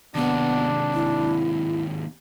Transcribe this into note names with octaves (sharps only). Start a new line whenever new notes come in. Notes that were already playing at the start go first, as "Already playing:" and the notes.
D#2 C3 B3 D4
E4